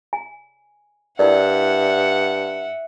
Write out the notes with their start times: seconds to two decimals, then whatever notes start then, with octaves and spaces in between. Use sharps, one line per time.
0.13 G#5
1.19 G2 E4 A#4 D5 E5 F#5